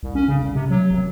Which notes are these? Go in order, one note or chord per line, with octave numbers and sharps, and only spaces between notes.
C2
C#4
C#3
C2
C3
F#3
G#1